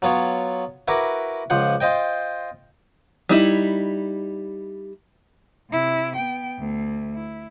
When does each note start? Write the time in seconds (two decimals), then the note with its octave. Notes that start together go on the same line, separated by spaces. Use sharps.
0.02 F#3 B3 F4 C#5
0.88 E4 F#4 A#4 B4 D6
1.50 C#2 F3 C5 F#5
1.81 F4 C5 D#5 G5
3.29 G3 D#4 E4
5.70 C3 E4
6.16 B3 G5
6.60 D2
7.14 E4